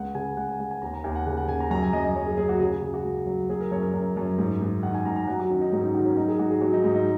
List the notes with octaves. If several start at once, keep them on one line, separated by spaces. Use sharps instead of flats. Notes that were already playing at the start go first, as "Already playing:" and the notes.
Already playing: C#2 F#5
C#3 G#5
C#2 F#5
G#5
C#2 F#5
G#5
D#2 A#5
A#5
D#2 G#5
F#5
C#3 F#5
F#5
C#3 G#5
A#5
F#2 A#5
G#5
F#2 D#5
D#5
F#2 C#5
G#4
F#3 G#4
F#4
C#3 G#4
G#4
C#3 F#4
F#4
C#2
F#3
F#3 G#4
A#4
F#2 C#5
A#4
F#2
F#2
G#2
G#2
D#3 F#5
G#5
G#2 A#5
A#5
F#3 F#5
F#4
D#3 C#4
D#4
G#2 C#4
D#4
D#3 F#4
C#4
F#3 D#4
G#4
G#2 F#4
G#4
F#3 F#4
D#4
G#2
D#4